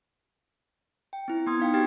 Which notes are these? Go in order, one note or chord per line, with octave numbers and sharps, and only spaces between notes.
G5
C4 E4
B3 C6 D#6 G#6
D#4 F5 G5
C4 F#4 G4 G5 G#6 A6